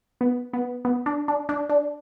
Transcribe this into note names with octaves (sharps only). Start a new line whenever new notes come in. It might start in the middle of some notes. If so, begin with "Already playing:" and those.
B3
B3
B3
D4
D4
D4
D4